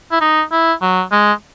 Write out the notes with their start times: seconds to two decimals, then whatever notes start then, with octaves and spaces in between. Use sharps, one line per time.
0.12 E4
0.21 D#4
0.52 E4
0.82 F#3
1.11 G#3